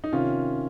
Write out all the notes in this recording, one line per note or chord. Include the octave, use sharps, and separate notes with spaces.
D#4
C3 D#3 C#4 F4